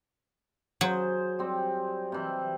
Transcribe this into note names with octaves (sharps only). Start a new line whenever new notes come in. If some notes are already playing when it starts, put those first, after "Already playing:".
F#3 G#4 C5
G3 C4
C3 E3